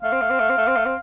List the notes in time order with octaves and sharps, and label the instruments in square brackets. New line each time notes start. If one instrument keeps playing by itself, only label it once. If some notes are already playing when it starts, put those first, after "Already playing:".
[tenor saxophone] A3 [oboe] F5
[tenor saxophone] C4
A3
C4
A3
C4
A3
C4
A3
C4